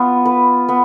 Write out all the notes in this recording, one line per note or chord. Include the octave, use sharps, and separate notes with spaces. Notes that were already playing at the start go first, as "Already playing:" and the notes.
Already playing: B3 F4
B4
B3